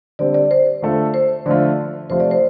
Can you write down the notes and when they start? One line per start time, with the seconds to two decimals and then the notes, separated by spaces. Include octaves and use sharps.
0.19 D3 G3 C4 D5
0.34 D5
0.51 C5
0.82 D3 A3 F4 A4
1.14 C5
1.46 D3 F3 A3 F4 D5
2.10 C3 F3 A3 F4 C5
2.20 D5
2.31 C5